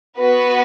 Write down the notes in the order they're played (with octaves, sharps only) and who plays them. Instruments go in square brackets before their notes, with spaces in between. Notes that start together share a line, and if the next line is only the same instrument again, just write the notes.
[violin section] B3 F#4 B4